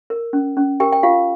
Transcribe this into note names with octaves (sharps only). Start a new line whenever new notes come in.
A#4
C#4
C#4
G4 A#4 G5
G5
F4 G4 F5